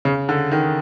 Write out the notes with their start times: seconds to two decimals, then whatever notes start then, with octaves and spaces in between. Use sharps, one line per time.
0.05 C#3
0.29 D3
0.51 D#3